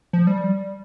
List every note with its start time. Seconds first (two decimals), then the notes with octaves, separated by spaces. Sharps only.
0.13 F3
0.27 G3